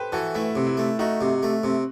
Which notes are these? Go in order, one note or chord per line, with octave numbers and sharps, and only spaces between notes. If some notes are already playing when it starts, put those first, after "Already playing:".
Already playing: G4 A4 B4 C5
E3 F#4 A4
A3 E4
C3
E4
A3
A3 D#4 F#4
C3
A3
C3